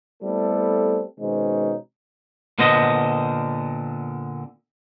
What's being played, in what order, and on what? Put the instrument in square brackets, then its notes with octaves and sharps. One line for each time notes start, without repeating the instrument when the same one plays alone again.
[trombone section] G3 A3 B3 C4 E4 A4
B2 D#3 G#3 C4 C#4 D#4
[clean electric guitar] A#2 D3 B3 C5 D#5